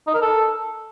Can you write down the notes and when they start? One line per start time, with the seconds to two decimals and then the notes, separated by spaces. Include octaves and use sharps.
0.07 D#4
0.15 A#4
0.22 A4